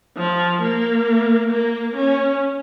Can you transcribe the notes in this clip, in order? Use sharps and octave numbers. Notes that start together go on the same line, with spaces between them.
F3
A#3
A#3
C#4